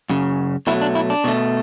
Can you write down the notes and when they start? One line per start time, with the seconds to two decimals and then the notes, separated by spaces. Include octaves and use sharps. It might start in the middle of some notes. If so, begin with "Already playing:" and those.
0.10 F#2 C#3
0.67 B2 F#3 A3 E4
0.81 D4
0.95 E4
1.10 D4
1.24 B2 A3